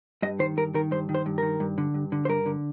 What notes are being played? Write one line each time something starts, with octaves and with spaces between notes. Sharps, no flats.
G2 D#5
D#3 C5
G2 A#4
D#3 A#4
G2 C5
D#3
C5
G2
D#3 A#4
G2
D3
G2
D3
C5
G2 A#4
D3